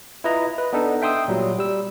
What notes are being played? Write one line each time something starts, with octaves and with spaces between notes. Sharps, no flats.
E4 F4 B4 D#5 A#5
B4
B3 D4 D#4 A4
E5 G5 C6 D#6 E6
A#2 F#3 G3
G3 E6